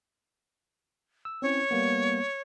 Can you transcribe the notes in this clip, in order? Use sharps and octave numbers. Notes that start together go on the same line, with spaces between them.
E6
C4 C#4 E4 C#5
G3 A#3 B3